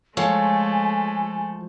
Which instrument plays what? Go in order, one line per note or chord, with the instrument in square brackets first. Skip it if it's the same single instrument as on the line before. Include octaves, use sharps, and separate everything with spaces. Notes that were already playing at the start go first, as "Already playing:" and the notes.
[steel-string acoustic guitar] F3 [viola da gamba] G#3 A3 [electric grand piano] A4 C#5 F5 [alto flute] G#5